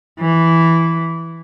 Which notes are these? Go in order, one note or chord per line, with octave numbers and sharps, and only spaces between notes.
E3